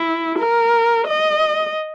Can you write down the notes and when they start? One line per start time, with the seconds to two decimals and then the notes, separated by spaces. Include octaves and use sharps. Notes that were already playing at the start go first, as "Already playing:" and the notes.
Already playing: E4
0.39 A#4
1.08 D#5